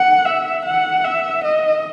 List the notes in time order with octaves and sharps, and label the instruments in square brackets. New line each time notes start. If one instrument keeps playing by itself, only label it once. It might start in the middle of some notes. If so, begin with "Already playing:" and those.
Already playing: [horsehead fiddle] F#5
E5
F#5
E5
D#5